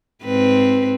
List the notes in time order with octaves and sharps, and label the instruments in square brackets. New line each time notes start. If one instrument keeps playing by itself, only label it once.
[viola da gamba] G#2 C4 B4